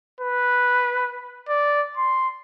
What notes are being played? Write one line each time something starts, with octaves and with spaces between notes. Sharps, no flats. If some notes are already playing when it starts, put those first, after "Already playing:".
B4
D5
C6